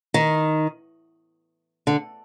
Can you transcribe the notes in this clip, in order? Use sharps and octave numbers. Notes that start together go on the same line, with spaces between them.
D#3
D3